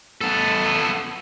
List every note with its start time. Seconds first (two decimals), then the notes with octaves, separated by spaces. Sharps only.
0.21 B3 A4